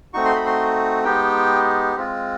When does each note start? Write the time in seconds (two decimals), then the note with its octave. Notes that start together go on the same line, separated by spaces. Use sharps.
0.13 A3 C4 D#4 F#4 C#6
0.25 C6
0.35 B5
0.46 C6
1.04 G#3 B3 D#4 G4 G5
1.96 G#3 C4 F4